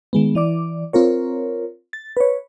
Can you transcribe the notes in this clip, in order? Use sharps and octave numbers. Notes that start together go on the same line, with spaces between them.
D#3 G#3 B3
E3 D5 D6
C4 F4 A#4 C#5
A6
B4 C#5